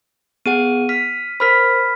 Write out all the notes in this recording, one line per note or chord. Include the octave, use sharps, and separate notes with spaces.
B3 G#4 F#5 D#7
F6 B6
A#4 C5 B5 F6 B6